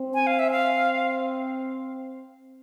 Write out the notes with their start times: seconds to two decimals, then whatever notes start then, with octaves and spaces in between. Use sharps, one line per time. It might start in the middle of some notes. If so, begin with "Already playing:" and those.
Already playing: C4
0.14 G#5
0.27 F5
0.39 E5
0.51 F5